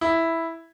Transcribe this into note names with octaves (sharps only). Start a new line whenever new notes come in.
E4